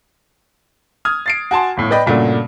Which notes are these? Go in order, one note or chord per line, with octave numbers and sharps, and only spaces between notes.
D#6 F6 G#6
A6 C7 D7
F#4 G#5 A5 C6
G1 A2
B4 D5 D#5 G5 B5
G2 A#2 C#3 A3 D4 F#4